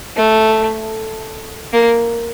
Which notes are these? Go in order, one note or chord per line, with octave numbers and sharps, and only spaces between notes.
A3
A#3